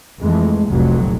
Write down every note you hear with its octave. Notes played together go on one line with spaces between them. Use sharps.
F2 E3 G#3 A3
F1 C2 F2 A#2 F#3